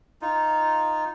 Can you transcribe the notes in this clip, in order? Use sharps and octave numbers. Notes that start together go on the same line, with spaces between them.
D#4 F4